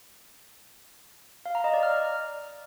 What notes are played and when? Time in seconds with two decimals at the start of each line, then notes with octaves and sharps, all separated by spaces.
1.46 F5
1.55 A#5
1.64 D#5
1.74 D5
1.83 F6